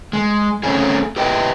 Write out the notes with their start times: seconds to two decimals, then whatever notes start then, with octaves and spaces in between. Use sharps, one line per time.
0.13 G#3
0.63 A3 C4 C#4 G#4
1.16 G4 B4 D#5 G5